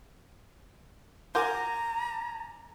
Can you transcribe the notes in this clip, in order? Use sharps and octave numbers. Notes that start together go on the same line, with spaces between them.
F4 F#4 A#4 G#5 A#5 D6 G6